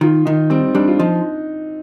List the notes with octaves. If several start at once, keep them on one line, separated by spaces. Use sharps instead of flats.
D#3 F4
D#3 D#4
G3 C4
G3 D4
F4
F3 D#4